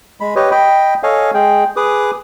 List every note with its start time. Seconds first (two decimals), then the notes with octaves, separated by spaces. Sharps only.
0.20 G#3 B5
0.36 G4 B4 C#5 D#5
0.51 D#5 G5 B5
1.03 A4 C#5 D#5 F5 G#5
1.34 G#3 G#4 G5
1.76 G#4 B4 D6 D#6